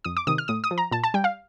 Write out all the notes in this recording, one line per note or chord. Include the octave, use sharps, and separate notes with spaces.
F2 D#6
D6
C3 D#3 D#6
F6
A2 D#6
D#6
F3
A#5
A#2 A5
A5
G3 G5
F5